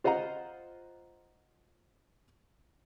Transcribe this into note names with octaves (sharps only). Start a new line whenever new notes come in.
F4 C5 D#5 F#5 A#5